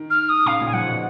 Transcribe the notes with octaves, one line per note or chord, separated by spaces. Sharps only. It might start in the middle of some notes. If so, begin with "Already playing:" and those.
Already playing: D#3
F6
D#6
C#3 F5
A#2
G#5
F3 F#5
A#2
B2